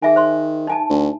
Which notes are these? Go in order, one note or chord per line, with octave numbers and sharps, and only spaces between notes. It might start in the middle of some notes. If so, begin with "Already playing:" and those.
D#3 G#4 E5 G#5
C5 C6
D#4 G#5 A5
D2